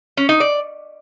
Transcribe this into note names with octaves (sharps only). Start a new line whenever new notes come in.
C#4
D#4
D5